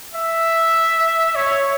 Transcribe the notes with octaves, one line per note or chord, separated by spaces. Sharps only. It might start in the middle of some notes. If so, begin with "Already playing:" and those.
E5
C#5